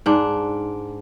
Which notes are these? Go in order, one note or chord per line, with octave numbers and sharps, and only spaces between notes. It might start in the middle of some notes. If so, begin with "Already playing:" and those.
G#2 D4